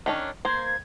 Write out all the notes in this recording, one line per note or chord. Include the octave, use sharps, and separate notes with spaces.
D#3 C#4 D4
A#3 C5 G#6